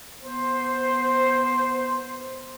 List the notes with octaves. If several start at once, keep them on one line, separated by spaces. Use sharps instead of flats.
B3 C5